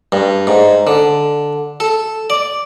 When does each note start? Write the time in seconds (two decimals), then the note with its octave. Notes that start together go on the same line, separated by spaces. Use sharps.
0.12 G2
0.47 G#2
0.87 D3
1.80 A4
2.30 D5